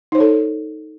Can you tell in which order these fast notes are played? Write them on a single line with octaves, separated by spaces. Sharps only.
D#4 C5 C#5 A4